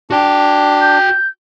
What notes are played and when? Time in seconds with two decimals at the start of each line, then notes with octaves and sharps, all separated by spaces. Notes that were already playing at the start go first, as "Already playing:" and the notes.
0.10 D4 F#4 G5
0.81 G6